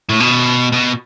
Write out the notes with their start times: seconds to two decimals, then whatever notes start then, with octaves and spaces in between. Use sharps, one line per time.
0.09 A2
0.20 B2
0.73 B2